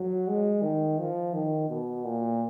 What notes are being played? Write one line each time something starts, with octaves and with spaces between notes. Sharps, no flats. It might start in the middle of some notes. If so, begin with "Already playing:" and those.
Already playing: F#3
G#3
D#3
F3
D#3
B2
A#2